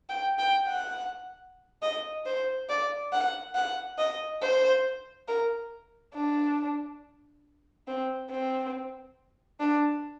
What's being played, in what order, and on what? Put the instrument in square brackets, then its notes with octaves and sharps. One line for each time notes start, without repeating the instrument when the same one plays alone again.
[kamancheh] G5
G5
F#5
D#5
C5
D5
F#5
F#5
D#5
C5
A#4
D4
C4
C4
D4